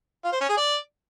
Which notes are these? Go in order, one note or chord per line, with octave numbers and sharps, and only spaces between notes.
F4
C5
C#4
G#4
D5